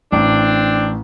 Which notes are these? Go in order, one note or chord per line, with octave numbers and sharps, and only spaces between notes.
A1 C4 D4